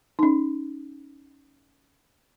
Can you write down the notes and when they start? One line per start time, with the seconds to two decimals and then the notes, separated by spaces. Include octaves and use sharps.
0.19 C#4 D#4